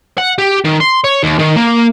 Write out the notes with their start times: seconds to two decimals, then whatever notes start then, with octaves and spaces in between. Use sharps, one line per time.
0.18 F#5
0.38 G4
0.64 D#3
0.80 C6
1.04 C#5
1.23 D#2
1.39 D#3
1.56 A#3